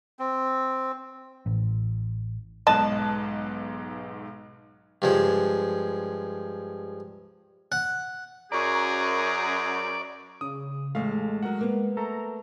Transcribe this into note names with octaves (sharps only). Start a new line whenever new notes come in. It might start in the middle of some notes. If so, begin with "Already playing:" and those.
C4
A1
B1 G#2 D#5 A5 F#6
G2 F3 G#3
F#5
F#2 G#4 D5 A#5 C#6
C#3 D#6
A1 G#3 A3 F5
F3 F#3 A#4 F#5
A#3 B3
A3 A4 A#5